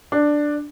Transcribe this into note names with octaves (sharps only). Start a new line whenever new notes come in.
D4